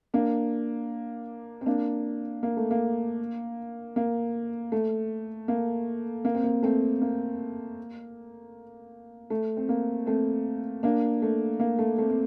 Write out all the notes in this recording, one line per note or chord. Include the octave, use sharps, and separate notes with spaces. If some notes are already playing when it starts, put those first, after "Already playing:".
A#3 D4
C4
A#3 D4
A#3
A3
A#3
A#3
A3
A#3
A#3
C4
A#3
A3 C4
A#3
A3
C4
A#3
A3 C4
A#3 D4
A3
A#3
A3
A3 C4
C4